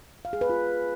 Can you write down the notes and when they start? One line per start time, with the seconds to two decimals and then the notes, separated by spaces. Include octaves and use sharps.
0.25 F5
0.33 G#4
0.41 B4
0.50 F4